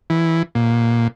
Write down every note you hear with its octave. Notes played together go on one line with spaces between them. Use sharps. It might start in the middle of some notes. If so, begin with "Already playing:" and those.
E3
A#2